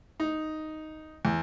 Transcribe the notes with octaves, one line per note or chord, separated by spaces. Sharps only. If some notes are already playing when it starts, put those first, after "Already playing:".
D#4
E2